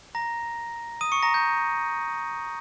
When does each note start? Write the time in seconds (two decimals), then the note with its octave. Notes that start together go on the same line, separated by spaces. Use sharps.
0.15 A#5 A#6
1.01 D#6 D#7
1.12 C#6 C#7
1.23 A#5 A#6
1.34 G6